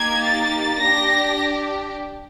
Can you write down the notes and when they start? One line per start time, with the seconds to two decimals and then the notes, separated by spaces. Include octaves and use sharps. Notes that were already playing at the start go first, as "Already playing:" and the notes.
Already playing: A#3 D#4 G4 G#6
0.23 A6
0.79 D4 G4 A#6